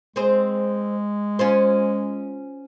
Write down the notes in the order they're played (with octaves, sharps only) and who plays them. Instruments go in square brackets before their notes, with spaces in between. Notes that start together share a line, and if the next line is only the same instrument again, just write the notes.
[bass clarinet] G#3 [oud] C4 G#4 C5
[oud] C#4 F4 C5